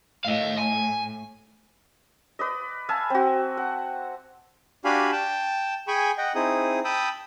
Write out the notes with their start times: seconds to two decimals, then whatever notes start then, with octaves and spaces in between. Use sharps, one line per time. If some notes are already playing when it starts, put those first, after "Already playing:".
0.25 A2 D#5 F5
0.58 G#5
2.39 B4 D5 D#5
2.89 E5 F5 G#5 A5
3.10 C4 F#4
3.57 F#5
4.85 D4 F#4 G4 F5 G#5 B5
5.12 G5 A5
5.88 G#4 G5 G#5 B5 C#6
6.18 D#5 F#5 G5
6.35 C4 D#4 E4 G#4 D#6
6.85 G5 A5 B5 D#6 E6